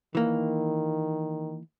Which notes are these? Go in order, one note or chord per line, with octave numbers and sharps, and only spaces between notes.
D#3 E3 A#3